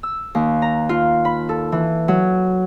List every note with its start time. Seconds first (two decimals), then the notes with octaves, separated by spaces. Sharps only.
0.03 E6
0.35 D#2
0.62 A#5
0.89 F4
1.25 B5
1.49 A4
1.72 E3
2.08 F#3